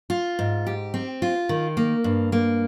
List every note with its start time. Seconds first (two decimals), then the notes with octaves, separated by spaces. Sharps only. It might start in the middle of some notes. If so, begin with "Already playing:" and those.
0.10 F4
0.39 G#2
0.67 G4
0.94 C4
1.22 F4
1.49 D#3
1.77 A#3
2.04 G2
2.32 A#3